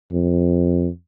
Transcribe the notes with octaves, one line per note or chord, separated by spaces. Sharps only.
F2